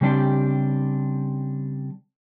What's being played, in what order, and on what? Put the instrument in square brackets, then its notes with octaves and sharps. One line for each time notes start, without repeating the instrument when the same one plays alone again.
[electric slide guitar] C#3 G3 C4 D4 G4